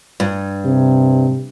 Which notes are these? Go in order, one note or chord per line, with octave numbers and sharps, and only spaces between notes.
G2
C3